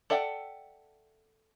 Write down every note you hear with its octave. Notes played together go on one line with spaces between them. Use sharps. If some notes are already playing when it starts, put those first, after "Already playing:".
A4 D5 E5 F#5 G5